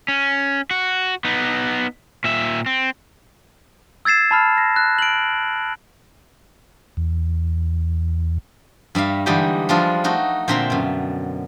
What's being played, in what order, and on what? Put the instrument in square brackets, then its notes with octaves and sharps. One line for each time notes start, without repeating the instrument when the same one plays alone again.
[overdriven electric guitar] C#4
F#4
B3 D#4
A#2 E5
C4
[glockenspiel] E6 G#6 A6 C7 E7
A5 B5 F6
A#6
F#6
D7 F#7
[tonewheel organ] E2
[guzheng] G2 G3 E5 F5
D3 E3 G3 G#3 D#4 G4
F3 G3 G#3 D4 F4
A3 D#4 F#4
A#2 D3 C4 E5 A#5 C6
F#2 B2